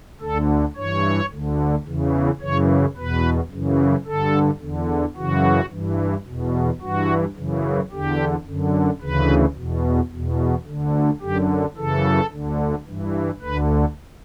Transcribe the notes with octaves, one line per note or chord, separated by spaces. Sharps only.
D2 D3 A4
G2 E3 C#5
D2 D3
E2 C#3 E3
F#2 C#3 E3 C#5
E2 B2 B4
F#2 C#3 E3
G2 D3 A4
E2 D3
F#2 C#3 E3 F#4
G2 E3
E2 B2
G2 E3 F#4
F#2 C#3 E3
E2 D3 G4
F#2 D3
D2 C#3 E3 B4
E2 B2
E2 B2
D2 D3
F#2 D3 G4
F#2 C#3 E3 A4
D2 D3
G2 E3
D2 D3 B4